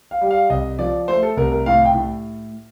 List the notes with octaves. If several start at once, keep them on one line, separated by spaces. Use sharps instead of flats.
F5
G3
F5
C2 D#5
F3 D5
A3 C5
A4
C2 A#4
A#4
A2 F5
G5
A2